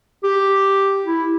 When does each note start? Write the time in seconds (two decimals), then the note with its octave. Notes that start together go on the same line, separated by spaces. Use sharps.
0.24 G4
1.06 E4